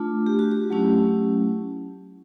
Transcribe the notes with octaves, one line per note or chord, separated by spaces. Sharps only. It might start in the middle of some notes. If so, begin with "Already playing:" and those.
Already playing: A3 D4 F4
G4
F#4
G4
F#3 A3 C#4 E4